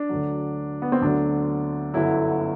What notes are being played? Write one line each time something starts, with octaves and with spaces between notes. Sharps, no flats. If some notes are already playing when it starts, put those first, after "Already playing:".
Already playing: D4
D2 D3 F#3
B3
C4
D2 D3 F#3 D4
G1 F#2 D3 F#3 E4